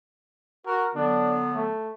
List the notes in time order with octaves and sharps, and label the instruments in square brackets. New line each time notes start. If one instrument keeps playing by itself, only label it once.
[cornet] F#4 [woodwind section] A#4
[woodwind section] D3 F#3 B3 [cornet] D4
[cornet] A3